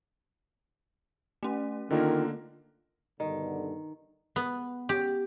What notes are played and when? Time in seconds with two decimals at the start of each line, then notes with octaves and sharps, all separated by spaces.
1.43 A3 C#4
1.90 D3 D#3 A#3 F4 A#4
3.20 G2 B2 D3 D#3
4.36 B3
4.89 G4